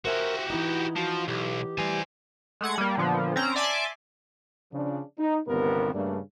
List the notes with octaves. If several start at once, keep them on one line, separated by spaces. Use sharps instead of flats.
F#4 G4 A#4 C5 E5 G#5
E3 B3 D#4 E4
F3 F#4
B1 G4
E3 G3 C5 G#5
G#3 A3 F#5 G#6
G3 A#3
A#2 D3 F3 B3
C4 C#4 A#5
D5 E5 G#5 A5 C6 D6
C#3 F3 D4
D#4
G1 D#2 C3 B3 C4 A#4
G2 C#3 A3 A#3 D4